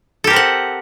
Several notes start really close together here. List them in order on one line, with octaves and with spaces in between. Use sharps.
A4 G4 A#4 C4 F#5